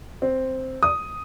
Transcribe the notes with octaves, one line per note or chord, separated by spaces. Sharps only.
C4
D#6